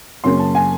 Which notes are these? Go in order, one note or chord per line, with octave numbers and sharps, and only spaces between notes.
F#2 C#3 F#3 A#3 C#4 C6
A5
G#5